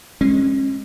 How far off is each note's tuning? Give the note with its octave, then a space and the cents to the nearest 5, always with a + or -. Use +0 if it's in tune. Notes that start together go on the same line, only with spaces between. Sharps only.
G#3 +0 C#4 -35